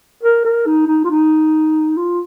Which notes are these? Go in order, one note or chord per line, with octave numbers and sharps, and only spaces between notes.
A#4
A#4
D#4
D#4
F4
D#4
F4